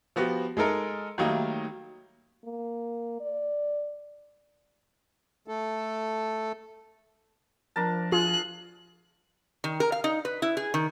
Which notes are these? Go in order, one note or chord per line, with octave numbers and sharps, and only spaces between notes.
F3 B3 F#4 G4
G#3 D#4 A4 A#4 D#5
D#3 F#3 G3 A3 A#3 D#4
A#3
D5
A3 A4
F3 D4 A#4 A5
F4 G#4 F#6
D#3
A#4
F5
D#4
B4
E4
G#4
D#3